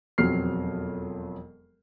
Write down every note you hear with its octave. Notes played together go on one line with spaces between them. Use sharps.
E1 F2 F#3 C4 F6 C7